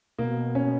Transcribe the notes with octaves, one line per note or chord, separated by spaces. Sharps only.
B2 A#3
C#4